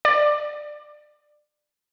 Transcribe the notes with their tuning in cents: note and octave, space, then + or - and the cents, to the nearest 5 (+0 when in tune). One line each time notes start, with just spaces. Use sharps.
D5 +15